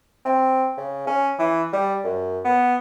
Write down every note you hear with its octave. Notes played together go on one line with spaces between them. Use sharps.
C4
C#3
C#4
E3
G3
F#2
B3